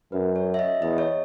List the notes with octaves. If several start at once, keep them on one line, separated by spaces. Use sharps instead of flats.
F#2 B4
C#5
E5
D#5
E2 D#5
C#5